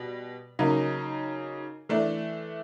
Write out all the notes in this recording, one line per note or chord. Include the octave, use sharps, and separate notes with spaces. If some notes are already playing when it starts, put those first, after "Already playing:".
Already playing: B2 G3
C#3 F#3 A#3 D#4
E3 A3 D4